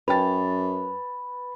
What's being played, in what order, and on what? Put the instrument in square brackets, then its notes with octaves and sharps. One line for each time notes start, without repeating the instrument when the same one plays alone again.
[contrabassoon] F#2 [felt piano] B4 A6 [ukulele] C#5 G5 A5 [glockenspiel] B5